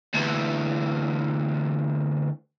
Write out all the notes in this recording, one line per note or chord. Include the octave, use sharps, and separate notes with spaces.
D2 E3